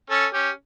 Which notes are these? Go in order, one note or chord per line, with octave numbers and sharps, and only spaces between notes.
C#4 A4
C#4 G4